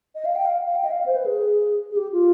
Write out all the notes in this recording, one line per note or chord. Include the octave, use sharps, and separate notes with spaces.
D#5
F5
G5
F5
F5
G5
D#5
F5
C5
B4
G#4
G#4
G4
F4